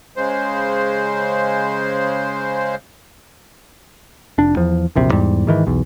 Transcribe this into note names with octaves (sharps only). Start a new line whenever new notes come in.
C#3 G#3 C5
F1 D4
E2 F3
E1 A#1 C3
E2 G#2 G3
G#2 D#3 E3
B1 E2